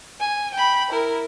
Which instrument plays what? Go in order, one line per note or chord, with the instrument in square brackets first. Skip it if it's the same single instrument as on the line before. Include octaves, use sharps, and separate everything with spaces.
[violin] G#5
G5 B5
E4 A#4